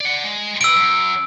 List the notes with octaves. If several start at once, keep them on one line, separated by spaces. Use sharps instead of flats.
D5 F#5
G#3
C3 B4 E6 D7
F#2